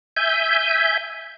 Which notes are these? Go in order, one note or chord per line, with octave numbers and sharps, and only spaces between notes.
E5 G#5 G6